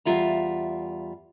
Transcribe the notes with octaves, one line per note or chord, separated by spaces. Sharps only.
E2 F#3 G3 F4 E5 A#5